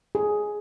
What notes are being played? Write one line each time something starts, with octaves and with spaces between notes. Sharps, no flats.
G#4